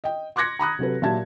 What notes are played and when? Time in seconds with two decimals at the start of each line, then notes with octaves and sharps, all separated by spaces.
0.04 D#5 G5
0.36 C6 D6 F#6 G#6 A#6 C#7
0.59 A#5 B5 D#6 F#6
0.79 C3 F#3 A4 B4
1.02 A#2 F#3 G4 E5 A5 G#6